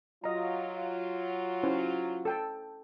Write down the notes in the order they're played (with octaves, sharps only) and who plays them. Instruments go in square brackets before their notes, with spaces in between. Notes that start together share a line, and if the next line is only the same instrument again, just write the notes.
[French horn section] F#3 F4 [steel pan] D#5 A#5
[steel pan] C#4 E4 C5
A4 G5 A5